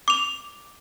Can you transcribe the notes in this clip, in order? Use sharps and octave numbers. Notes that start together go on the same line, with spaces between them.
D6 F7